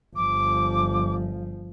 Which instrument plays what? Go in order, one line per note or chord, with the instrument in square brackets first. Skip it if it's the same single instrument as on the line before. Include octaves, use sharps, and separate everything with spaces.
[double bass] G1 F3 [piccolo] D6